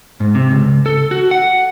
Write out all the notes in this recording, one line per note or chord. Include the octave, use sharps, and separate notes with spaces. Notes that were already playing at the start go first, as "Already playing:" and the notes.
G#2
C3
C#2
A4
F#4
F#5